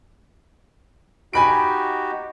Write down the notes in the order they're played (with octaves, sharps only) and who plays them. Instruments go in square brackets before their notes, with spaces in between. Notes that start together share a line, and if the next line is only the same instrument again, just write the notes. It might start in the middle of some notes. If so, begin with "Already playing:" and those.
[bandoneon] D#4 F#4 G4 [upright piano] G#5 B5 D7